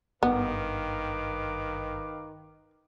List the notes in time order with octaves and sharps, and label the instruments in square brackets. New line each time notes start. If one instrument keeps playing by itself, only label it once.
[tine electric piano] G#1 G2 [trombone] D#3 [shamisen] B3 [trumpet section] B4 F5 D6